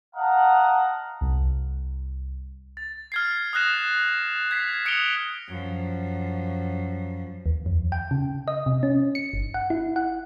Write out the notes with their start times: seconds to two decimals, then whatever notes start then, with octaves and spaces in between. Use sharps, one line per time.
0.15 D#5 F5 F#5 A5 A#5
1.21 C2
2.77 A6
3.12 F6 G#6 C7
3.53 D#6 F6 F#6 A#6 E7
4.51 G#6 B6 C7
4.85 D#6 C#7 D7 F7 G7
5.48 F#2 F3
7.46 D#2
7.66 F2
7.92 G5
8.11 C#3
8.48 D#5
8.66 C3
8.83 C#4
9.15 C#7
9.33 G1
9.54 F#5
9.70 E4
9.96 F#5